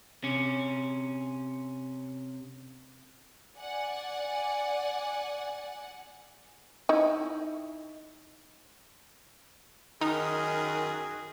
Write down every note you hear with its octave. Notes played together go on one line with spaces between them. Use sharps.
C3 C#4
D5 F#5 G#5
D#4 E4
F#2 D#3 D#4 G#4